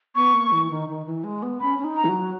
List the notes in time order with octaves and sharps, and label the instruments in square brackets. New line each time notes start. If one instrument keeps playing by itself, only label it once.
[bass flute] B3 [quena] C#6
[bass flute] A#3
E3
D#3
D#3
E3
G#3
B3
[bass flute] C#4 [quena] B5
[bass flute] C#4
D#4
[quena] A#5
[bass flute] E3
F#3